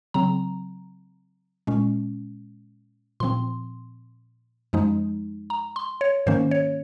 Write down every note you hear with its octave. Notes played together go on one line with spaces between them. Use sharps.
C#3 F#3 C4 A#5
A#2 G#3 C#4
A#2 F3 C4 C6
F#2 F3 G#3 D#4
A#5
C6
C#5
G#2 D#3 A#3 C#4 C5
C#5